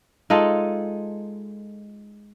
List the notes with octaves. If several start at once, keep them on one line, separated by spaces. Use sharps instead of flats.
G#3 D#4 F4 A4